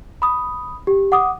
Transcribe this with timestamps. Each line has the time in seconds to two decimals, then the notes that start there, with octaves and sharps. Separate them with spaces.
0.22 B5 D#6
0.87 G4
1.12 F#5 D6 D#6